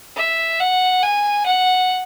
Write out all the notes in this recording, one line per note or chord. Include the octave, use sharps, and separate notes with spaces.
E5
F#5
G#5
F#5